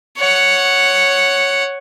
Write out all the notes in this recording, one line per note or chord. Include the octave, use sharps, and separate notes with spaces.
C#5 F#5